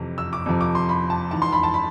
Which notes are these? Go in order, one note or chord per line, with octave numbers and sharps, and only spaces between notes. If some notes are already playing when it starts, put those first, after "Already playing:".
Already playing: F2 C3 E3
E6
D6
F2 C3 F3
D6
C6
B5
A5
G#2 E3 A5
C6
B5
A5
B5